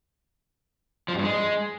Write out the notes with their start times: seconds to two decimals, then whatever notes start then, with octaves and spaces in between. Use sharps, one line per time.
1.08 F3
1.13 F2
1.18 G2
1.24 G#3